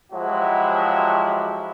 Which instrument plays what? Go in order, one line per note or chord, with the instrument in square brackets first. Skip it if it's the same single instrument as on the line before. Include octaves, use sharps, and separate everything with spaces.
[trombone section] F3 F#3 G#3 E4 F#4 G4